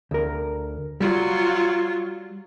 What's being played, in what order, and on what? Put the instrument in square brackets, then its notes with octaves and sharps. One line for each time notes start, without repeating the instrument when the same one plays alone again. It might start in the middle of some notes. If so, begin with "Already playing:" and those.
[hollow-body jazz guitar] D2 A#4
[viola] F#3 F4 [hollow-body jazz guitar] G3